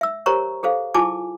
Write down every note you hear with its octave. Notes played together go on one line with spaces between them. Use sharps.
E5 E6
G4 A#4 C5 C#5 A#5 C#6
G#4 A4 C5 F5
E4 F4 G#4 G#5 A5 D6